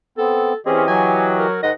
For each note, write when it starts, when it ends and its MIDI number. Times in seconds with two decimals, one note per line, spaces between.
0.18 0.53 59
0.18 0.53 60
0.18 0.57 69
0.66 1.47 52
0.66 0.86 60
0.66 0.86 61
0.66 1.47 67
0.66 0.87 68
0.66 1.47 75
0.88 1.57 54
0.88 1.30 80
1.38 1.63 70
1.63 1.71 44
1.63 1.71 51
1.63 1.72 75
1.63 1.71 78